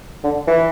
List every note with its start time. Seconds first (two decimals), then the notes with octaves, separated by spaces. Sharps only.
0.24 D3
0.47 E3